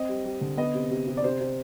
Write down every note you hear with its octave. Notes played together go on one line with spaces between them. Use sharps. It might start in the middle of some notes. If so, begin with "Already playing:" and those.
Already playing: C4 D#5
G3
G3
D3
B3 D#5
C3
C3
C3
D5
C3 C5
C3